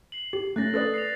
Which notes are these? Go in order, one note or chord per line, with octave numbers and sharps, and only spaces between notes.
C7 F#7
G4
A3 C#4 F#6 A6 A#6
A4 B4 D5 D#6 A6 F#7
C7 F7